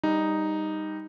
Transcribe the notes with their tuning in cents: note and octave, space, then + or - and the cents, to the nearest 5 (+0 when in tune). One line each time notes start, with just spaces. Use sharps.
G3 +15 D#4 +0